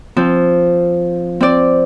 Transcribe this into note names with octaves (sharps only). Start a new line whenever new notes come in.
F3 C4
C4 D5